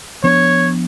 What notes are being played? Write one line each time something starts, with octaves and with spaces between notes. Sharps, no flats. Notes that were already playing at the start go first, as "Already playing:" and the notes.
F3 B3 D4 C#5